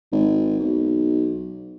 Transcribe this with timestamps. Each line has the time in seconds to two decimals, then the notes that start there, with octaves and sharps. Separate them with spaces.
0.12 G#1
0.59 B1